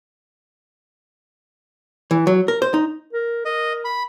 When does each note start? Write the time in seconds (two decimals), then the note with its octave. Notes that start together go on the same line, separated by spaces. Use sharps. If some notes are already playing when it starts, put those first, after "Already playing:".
2.11 E3
2.27 F#3
2.48 A#4
2.62 C5
2.74 D#4
3.13 A#4
3.45 A#4 D#5
3.85 B5